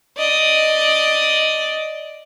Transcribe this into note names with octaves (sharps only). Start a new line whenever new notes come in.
D5 D#5